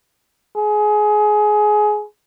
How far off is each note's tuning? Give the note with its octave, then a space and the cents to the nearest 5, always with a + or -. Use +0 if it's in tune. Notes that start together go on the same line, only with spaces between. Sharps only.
G#4 +20